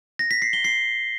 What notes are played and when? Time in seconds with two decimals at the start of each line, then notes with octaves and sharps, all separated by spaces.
0.19 A#6
0.31 B6
0.42 C7
0.53 G7
0.65 C7